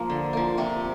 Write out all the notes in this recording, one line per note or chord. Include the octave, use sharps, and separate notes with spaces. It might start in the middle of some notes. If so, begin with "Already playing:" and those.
Already playing: F3 A#3
D3
F3 A#3
C3 G4